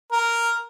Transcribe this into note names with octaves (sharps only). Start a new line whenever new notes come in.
A#4